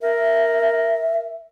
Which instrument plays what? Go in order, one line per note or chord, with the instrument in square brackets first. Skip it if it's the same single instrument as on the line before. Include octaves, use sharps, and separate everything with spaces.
[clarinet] A#4 [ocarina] E5